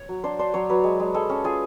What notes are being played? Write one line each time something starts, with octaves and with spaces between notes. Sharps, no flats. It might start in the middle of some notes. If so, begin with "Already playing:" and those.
Already playing: C#5
F#3
D4 C5
D4 C5
F#3 C#5
F#3 B4
G#3
G#3
G#3 A4
C#4
F4 G#4